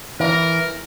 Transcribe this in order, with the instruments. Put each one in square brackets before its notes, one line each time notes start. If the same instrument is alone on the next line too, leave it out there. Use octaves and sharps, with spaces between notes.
[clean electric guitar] E3 [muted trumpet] A#4